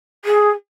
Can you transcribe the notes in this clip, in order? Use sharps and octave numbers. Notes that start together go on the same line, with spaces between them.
G#4